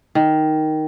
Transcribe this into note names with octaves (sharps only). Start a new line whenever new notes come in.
D#3